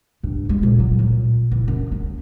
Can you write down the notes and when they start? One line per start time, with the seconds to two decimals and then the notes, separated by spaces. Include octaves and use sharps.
0.23 G2
0.49 G#3
0.63 A#2
0.79 F#3
0.99 A#2
1.51 E3
1.68 F#2
1.92 C#4